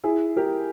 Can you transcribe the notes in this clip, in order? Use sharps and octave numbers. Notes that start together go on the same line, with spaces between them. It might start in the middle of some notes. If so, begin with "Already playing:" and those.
E4 G#4
G4 A#4